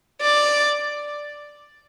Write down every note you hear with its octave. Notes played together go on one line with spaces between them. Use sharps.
D5